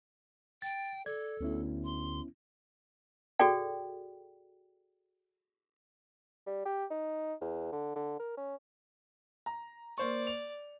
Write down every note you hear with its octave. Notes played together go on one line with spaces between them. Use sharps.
G5 A6
A4 D5 G#6
D2 B3 C#4 E4
C6
F#4 G#4 A4 D5 G5
G3
G4
D#4
E2
D3
D3
A#4
C#4
A#5
A#3 C5 D5 C#6
F7